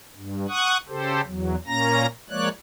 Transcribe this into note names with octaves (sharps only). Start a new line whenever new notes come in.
G2
F#5 C#6 D#6 F#6
C#3 G4 A4 C5
E2 F#3
A#2 A#3 C#4 A#5 A#6
F3 G#3 A#3 C#5 D5 F#6